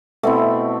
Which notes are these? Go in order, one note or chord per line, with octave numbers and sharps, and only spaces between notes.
B2 A3 C4 E4